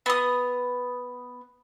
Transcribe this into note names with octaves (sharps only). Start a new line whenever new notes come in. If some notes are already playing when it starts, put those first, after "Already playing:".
B3 D#6